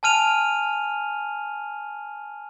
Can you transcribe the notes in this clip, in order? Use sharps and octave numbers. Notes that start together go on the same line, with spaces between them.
G#5 A5 F6 D#7 F7